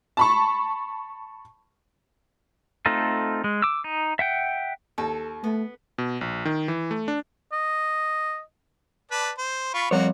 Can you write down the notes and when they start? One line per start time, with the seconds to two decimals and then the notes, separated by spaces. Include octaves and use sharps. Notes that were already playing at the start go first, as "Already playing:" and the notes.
0.17 A5 B5 C#6
2.86 A3 C4 D#4 F4 A4
3.44 G#3
3.62 D6 E6
3.84 D#4
4.19 E5 F#5 G5
4.98 D#2 A4
5.44 A3 B3
5.98 B2
6.21 A#1
6.45 D#3
6.68 E3
6.91 A3
7.08 D4
7.53 D#5
9.11 B4 D5 A5
9.38 C5
9.74 F4 B5 C#6
9.91 F2 G3 A#3 F#4 C#5